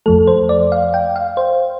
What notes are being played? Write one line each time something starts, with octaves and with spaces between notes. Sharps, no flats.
F2 F3 A3 A4
C5
D5
F5
G5
F5
C5